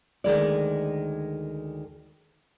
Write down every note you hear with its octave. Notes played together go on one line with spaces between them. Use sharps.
D2 D#3 G#3 D5